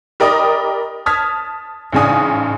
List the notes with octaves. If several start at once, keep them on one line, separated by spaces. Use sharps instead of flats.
G4 A#4 D5 D#5 B5 D#6
A5 D#6 F6 G#6 B6
A1 G#2 C#3 D4 G#5 D#6